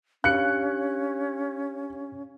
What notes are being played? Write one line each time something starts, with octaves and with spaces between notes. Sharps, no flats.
C#4 D4 G4 F5 F#6 C#7